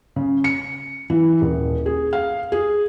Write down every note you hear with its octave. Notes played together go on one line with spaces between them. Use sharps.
C#3
C#7
E3
D#1
G#4
F5
G#4